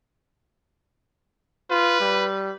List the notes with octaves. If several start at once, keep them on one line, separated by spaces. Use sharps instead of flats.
F4 B4
G3